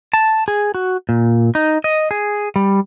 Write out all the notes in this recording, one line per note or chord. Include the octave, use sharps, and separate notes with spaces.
A5
G#4
F#4
A#2
D#4
D#5
G#4
G3